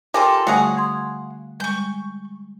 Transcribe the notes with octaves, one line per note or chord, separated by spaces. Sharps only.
F4 G4 A4 A#4 G#5
D3 G3 A3 F#4 G#4 F5 F#5
C6 D#6 G#6
G3 G#3 C#6 G6